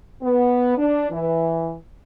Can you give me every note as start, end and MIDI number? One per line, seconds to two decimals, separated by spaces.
0.23 0.76 59
0.77 1.10 62
1.11 1.74 52